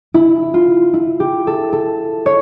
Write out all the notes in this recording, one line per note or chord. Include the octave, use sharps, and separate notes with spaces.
E4
F4
E4
G4
A4
A4
C#5